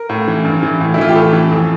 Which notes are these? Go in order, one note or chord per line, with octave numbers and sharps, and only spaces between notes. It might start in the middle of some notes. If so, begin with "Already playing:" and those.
Already playing: A#4
A2
E3
G2
E3
A2
E4
E3 F4
G4
A2 A4
E3
F2